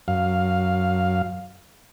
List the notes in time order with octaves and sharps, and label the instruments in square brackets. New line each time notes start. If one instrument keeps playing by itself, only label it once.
[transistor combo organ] F#2 F5